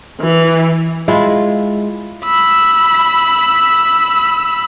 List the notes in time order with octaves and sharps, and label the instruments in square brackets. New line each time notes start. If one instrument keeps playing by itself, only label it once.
[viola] E3
[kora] G#3 E4 F4
[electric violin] B5 E6